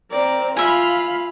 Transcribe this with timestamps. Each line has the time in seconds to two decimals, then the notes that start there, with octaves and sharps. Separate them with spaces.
0.11 C4 A#4 D5
0.57 F4 E5 F5 G#5 B5